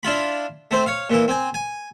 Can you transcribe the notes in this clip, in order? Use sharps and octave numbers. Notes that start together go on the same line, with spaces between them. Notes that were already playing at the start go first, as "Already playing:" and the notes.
D4 E4 F4 B5
A3 C4 C5
C#5 F5
A#2 E3 E4
C4 G#5
G#5